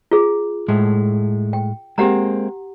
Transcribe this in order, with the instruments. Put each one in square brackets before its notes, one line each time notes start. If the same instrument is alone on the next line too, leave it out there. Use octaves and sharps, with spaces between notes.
[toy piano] F4 G#4
[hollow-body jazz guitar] A2 G#3 A3
[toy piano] G5
[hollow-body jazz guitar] G#3 A#3 C4 [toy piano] G4 F#5 A#5